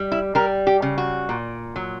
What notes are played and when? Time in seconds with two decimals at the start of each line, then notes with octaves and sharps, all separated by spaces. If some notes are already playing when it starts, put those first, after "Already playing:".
Already playing: G3
0.12 E4
0.35 G3 A#4
0.67 G4
0.82 C#3
0.98 F#4
1.29 A#2
1.76 F#3